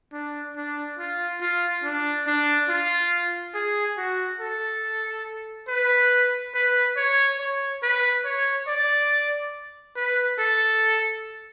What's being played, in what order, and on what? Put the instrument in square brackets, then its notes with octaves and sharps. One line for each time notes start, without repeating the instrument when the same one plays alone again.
[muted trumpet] D4
D4
F4
F4
D4
D4
F4
G#4
F#4
A4
B4
B4
C#5
C#5
B4
C#5
D5
B4
A4